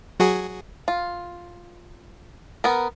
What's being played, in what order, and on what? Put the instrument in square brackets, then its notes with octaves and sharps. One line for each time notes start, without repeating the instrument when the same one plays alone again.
[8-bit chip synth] F#3 F#4 G#4
[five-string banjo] F4
B3 A#4